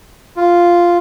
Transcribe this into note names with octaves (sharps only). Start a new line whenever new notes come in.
F4